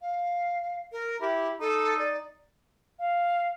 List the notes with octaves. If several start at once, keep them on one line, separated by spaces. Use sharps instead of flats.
F5
A#4
E4 G4
D#4 A4
D5
F5